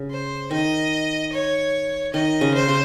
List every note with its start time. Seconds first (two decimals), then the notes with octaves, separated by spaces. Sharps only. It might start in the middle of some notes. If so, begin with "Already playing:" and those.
Already playing: C#3
0.11 C5
0.51 D#3 D#5
1.33 C#5
2.14 D#3 D#5
2.41 C#3
2.55 C5
2.68 C#3